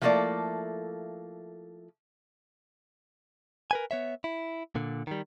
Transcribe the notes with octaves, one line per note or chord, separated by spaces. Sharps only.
F3 A3 A#3 E4 A4 D5
A#4 B4 G#5
B3 C#5 E5
E4
A#2 D3
D#3 G3